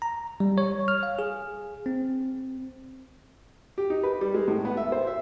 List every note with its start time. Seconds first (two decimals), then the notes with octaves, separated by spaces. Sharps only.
0.02 A#5
0.40 G3
0.58 C#5
0.88 F6
1.03 F5
1.19 G#4
1.86 C4
3.78 G4
3.90 D#4
4.03 B4
4.21 G3
4.34 G#3
4.48 A2
4.65 B3
4.77 E5
4.92 C5
5.07 E5